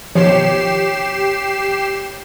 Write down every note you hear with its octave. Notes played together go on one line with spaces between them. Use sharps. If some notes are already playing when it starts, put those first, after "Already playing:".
B2 D#3 F3 G4 C#5 C7 E7